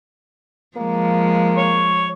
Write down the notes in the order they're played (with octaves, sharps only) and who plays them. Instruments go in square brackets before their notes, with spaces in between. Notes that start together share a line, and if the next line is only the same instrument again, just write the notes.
[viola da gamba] F3 G#3 [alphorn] A#3
[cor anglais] C#5